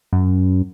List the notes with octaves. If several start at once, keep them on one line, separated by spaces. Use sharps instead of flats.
F#2